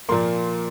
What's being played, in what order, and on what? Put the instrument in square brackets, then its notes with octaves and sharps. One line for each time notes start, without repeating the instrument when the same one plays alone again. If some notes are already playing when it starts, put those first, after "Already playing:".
[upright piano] A#2 F3 A#3 C6